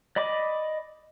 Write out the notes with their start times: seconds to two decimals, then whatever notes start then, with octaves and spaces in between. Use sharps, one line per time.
0.16 D5 D#5 B5 D6